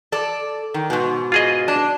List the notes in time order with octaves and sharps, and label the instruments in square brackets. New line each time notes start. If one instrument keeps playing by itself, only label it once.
[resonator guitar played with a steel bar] A4 D5
D#3
G#2 B2
[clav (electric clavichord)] F4 G#4 D#5
[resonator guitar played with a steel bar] D4